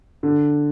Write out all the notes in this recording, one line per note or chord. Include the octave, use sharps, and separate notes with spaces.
D3